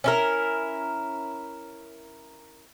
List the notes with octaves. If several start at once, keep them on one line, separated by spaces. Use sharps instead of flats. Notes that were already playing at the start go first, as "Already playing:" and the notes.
C#4 E4 A#4